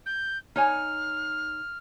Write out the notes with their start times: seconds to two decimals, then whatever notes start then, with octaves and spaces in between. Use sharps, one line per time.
0.06 G6
0.56 D#4 C#5 G#5 F6